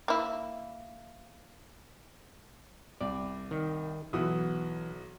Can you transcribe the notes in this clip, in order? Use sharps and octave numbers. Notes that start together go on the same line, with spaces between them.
A#3 E4
C2 D5
D#3
B1 E3 F#4 D#6